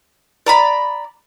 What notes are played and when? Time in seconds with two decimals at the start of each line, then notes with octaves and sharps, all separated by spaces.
0.46 D5 A#5 B5